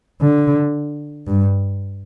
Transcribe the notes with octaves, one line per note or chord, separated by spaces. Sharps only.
D3
G2